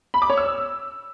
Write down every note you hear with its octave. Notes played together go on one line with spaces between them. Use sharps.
B5
D6
C#5
E6